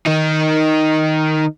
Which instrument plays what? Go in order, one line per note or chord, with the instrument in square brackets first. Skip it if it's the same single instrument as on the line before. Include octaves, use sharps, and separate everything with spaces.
[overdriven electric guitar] D#3 D#4